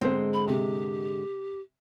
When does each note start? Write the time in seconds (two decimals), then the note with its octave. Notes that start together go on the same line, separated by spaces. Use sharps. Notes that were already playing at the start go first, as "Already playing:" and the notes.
0.01 G#2 D3 G#3 C4 C5
0.34 B5
0.48 C3 G4